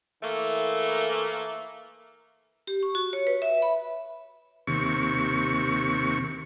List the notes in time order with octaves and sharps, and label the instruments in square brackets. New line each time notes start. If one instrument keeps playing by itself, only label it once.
[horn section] E3 A3 A#3
[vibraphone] G4
C#6
F#4
C#5
B4
E5
B5
[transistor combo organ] D#2 C3 C#6